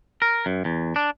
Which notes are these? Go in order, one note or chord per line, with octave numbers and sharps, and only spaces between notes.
A#4
F#2
E2
D4